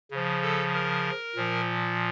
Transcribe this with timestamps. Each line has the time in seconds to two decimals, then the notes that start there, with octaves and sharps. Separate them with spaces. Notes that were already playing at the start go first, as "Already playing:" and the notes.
0.11 C#3 F3
0.42 A4
0.74 A#4
1.36 A#2 F3